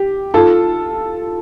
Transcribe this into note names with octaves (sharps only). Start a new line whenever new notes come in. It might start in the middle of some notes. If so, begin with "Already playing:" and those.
Already playing: G4
F4 A4